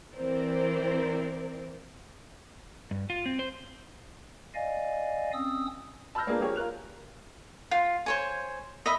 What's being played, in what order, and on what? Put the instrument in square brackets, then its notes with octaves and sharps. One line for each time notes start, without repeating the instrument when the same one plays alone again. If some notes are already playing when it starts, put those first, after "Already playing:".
[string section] E3 C4 A#4 C5 D5
[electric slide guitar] G2
F4
C4
C5
[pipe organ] D5 D#5 F5 G#5
C4 C#4 D#6 E6
[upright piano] A5 B5 E6 F6 G6 A#6
A#3 B3 D4 F4 G#4 A#4
F3 A#3 G4 G#4 C#5
F4 A#4 F#6 F7
[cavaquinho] F4
C5 C#5 G#5
D#5 E5 B5